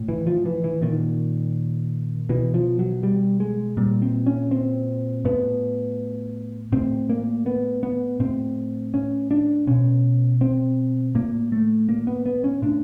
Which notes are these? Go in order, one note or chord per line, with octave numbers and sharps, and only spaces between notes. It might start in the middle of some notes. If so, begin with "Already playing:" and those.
Already playing: A2
E3
F3
E3
E3
A#2 D#3
B2 E3
F3
F#3
G3
G#3
A#2 G3
C4
C#4
C4
A2 B3
A2 C4
A#3
B3
B3
A2 C4
C#4
D4
B2 C#4
C4
A2 A#3
A3
A#3
B3
B3
C#4
A2 D4